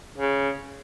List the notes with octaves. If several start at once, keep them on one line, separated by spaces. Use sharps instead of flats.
C#3